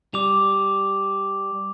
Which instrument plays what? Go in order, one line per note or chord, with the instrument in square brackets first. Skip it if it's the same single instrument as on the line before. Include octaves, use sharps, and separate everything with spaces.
[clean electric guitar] G3 [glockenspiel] D6 F7